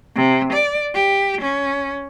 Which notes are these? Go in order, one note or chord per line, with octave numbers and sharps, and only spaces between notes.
C3
D5
G4
C#4